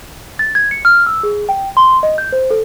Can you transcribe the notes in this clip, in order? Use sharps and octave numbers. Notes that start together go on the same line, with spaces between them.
A6
G#6
C#7
F6
E6
G#4
G5
C6
D#5
G6
C5
A4